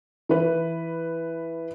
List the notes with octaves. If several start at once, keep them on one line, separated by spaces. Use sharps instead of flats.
E3 B4